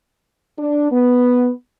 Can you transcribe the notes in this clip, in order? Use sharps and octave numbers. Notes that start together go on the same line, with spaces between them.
D4
B3